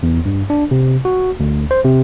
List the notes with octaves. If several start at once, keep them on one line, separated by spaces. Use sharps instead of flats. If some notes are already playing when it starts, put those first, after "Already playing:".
E2
G2
D4
C3
F#4
D2
C5
C3